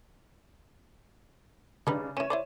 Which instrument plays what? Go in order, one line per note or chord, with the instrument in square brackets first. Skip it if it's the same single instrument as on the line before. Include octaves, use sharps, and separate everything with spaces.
[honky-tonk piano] C#3 D4 [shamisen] G3 D#4 B4
[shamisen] E3 C#4 [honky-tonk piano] C#5 D#7 E7
[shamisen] E4 C5 D5